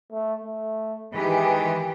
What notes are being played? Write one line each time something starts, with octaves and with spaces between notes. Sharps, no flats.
A3
A3
D#3 E3 G#3 G4